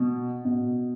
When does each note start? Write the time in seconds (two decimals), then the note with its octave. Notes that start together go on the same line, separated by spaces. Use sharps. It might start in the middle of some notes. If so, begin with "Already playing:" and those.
Already playing: B2
0.45 B2